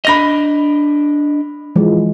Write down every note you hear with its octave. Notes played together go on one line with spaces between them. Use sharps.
D4 D#5 B5 A#6 F7
E3 F3 G#3